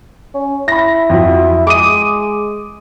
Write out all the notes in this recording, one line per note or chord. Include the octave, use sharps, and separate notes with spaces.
C#4
E4 B5 A#6
F2 F#3
G#3 D6 D#6 D#7